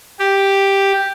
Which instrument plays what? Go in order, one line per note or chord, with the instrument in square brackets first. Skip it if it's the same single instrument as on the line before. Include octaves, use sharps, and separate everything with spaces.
[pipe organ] G4